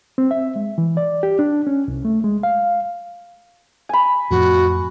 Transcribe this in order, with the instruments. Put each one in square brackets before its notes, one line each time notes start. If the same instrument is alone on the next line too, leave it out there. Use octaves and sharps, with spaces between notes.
[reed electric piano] C4
E5
G#3
E3
D5
G4
D4
C#4
C2
A3
G#3
F5
[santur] G#5 B5
[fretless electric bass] F2 A2 [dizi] F#4